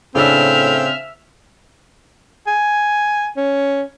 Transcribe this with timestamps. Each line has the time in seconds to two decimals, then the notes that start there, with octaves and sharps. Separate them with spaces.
0.15 A2 C#3 C4 D4 E5 E6 F6
2.47 G#5
3.37 C#4